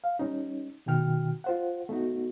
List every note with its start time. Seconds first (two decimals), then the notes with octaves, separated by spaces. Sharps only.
0.04 F5
0.19 G3 C#4 D#4
0.86 B2 D#3 F#4 G5 F6
1.44 F4 C5 F#5
1.89 A3 B3 D#4 F#4